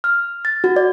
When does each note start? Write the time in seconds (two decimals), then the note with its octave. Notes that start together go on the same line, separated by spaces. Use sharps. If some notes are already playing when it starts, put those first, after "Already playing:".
0.04 F6
0.45 A6
0.64 F#4
0.76 D5